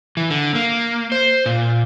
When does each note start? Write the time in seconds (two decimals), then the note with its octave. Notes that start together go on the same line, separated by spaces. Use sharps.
0.17 E3
0.30 D3
0.55 A#3
1.12 C5
1.46 A#2